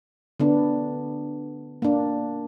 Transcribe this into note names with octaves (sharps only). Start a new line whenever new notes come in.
D3 B3 D4
A#3 D4